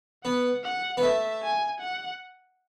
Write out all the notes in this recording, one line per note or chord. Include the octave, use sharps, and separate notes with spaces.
B3 F#5
F#5
B3
A3 E5
G#5
F#5